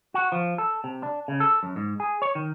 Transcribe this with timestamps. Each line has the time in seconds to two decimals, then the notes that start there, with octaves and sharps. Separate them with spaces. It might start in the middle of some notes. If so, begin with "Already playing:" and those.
0.14 F#4
0.32 F3
0.58 A4
0.84 C3
1.03 D4
1.28 C#3
1.40 A4
1.63 F#2
1.76 G#2
2.00 G#4
2.22 C#5
2.35 D#3